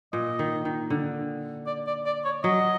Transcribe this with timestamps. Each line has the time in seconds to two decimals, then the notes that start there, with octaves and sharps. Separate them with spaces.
0.13 A#2 D#5
0.39 D#3
0.65 D#3
0.90 D3
1.67 D5
1.87 D5
2.06 D5
2.25 C#5
2.44 F#3 D#5